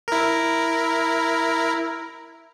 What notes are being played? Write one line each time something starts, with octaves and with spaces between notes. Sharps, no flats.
E4 A#4